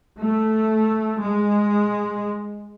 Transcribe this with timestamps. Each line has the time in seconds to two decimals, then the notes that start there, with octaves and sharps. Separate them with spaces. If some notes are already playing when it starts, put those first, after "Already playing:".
0.21 A3
1.20 G#3